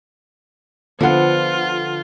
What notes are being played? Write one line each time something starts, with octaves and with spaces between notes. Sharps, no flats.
D3 F3 B3 F4 F#5